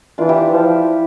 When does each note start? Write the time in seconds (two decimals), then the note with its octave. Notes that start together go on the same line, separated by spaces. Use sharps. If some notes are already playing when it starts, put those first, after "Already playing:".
0.18 E3 D4 F4
0.29 E4 G4
0.52 F3